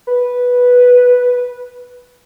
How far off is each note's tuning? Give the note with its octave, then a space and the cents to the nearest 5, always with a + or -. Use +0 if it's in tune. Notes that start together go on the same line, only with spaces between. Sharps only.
B4 -5